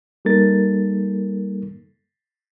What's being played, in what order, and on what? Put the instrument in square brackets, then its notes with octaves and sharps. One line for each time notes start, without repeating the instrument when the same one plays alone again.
[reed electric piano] G3 A#3 D#4 A4 A#4 A6